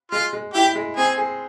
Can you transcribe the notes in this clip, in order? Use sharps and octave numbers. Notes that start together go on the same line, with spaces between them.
G#3 F4
G#3
E4 G4
G#3
C4 G#4
G#4